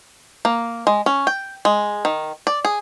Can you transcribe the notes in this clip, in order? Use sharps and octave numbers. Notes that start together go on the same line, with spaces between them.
A#3
G#3
C#4
G5
G#3
D#3
D5
G#4